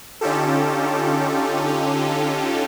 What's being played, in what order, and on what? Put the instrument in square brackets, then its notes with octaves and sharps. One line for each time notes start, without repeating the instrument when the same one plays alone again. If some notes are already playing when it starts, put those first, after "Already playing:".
[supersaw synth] D3 C#4 D#4 F4 G4 A4